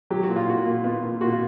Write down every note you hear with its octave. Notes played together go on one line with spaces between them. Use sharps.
F#3 G4
F#4
A#2
F4
A#2 F#4
A#2
B3 F4
A#2
A#2 F#4
F4